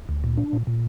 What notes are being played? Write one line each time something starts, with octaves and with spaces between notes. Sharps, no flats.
D2
A#2
D4
A#2
A#2